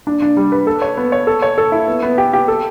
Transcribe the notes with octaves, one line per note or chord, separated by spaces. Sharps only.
D4
D4
G3
B4
A4
C#5
B3
C#5
A4
C#5
A4
E4
B3
B3
G4
G4
A4